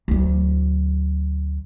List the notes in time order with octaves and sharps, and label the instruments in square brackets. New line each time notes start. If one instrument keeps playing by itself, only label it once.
[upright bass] D2 F#3